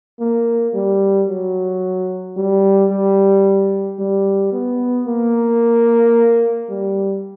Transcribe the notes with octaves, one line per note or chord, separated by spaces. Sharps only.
A#3
G3
F#3
G3
G3
G3
B3
A#3
G3